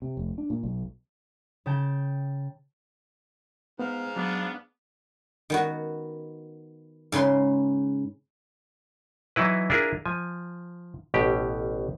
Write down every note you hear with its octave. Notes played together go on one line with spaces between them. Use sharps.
C3
F1
D4
A#2
B1
C#3 G5 A5
G#2 B3 F5
F#3 B3 D4
D#3 B3 F#4
G#2 C#3 B4 C6
E3 F#3 D#4 E4 B4
D4 E4 F4 G#4 A#4
F3 G#5
A1 B2 G4